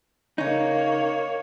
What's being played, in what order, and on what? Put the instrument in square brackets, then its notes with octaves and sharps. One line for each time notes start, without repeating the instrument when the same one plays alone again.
[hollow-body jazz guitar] C#3 D#4 [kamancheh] A#3 C#5